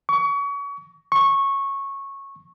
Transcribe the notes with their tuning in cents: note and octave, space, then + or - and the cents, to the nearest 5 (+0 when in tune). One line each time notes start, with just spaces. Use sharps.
C#6 +30
C#6 -15